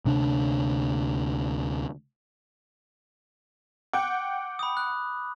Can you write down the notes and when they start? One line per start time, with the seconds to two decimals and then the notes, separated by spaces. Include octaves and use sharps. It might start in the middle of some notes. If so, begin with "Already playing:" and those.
0.05 D2 C3 D4
3.93 F#5 G5 D6
4.59 B5 D#6
4.77 F#6